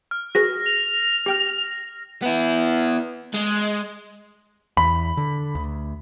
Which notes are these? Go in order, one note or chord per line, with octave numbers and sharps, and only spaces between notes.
F6
F#4 G#4 B4 A#6
F7
G4 G5 F6
B3 E4
G#3
E2 B5
D3
D2